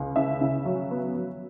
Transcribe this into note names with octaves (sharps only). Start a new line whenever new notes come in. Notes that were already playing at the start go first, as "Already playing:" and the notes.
Already playing: C#2
C#3 E5
C#3
F#3
B3
F#3